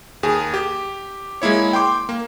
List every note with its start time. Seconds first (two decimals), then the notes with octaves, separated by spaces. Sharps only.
0.23 D#2 G#4 G#5
0.54 G4
1.42 G#3 A#3 E4 C#5
1.73 G5 C6 D6
2.09 A#3